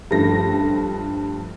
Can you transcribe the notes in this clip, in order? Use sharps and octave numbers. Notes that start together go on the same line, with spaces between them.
G2 F3 A3 A#6